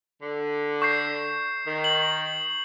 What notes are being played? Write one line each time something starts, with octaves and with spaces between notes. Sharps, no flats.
D3
C#6 G6 C7
D#3
F#7